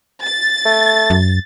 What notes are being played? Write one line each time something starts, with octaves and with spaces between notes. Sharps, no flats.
A6
A3
F#2